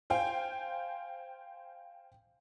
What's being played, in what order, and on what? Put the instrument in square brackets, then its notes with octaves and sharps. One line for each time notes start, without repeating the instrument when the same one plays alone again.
[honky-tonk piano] C5 F5 G5 G#5